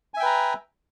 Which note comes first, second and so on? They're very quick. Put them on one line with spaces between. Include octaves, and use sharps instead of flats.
G#5 E5 G5 B4 A#5